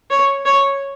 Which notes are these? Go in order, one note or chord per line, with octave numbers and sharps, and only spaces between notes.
C#5
C#5